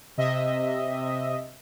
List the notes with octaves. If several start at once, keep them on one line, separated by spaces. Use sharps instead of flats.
C3 D#5 E5